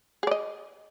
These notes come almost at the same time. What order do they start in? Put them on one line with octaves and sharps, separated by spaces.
G#4 D5 D#5